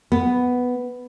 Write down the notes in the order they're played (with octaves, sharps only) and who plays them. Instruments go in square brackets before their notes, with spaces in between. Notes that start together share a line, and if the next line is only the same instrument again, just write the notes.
[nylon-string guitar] B3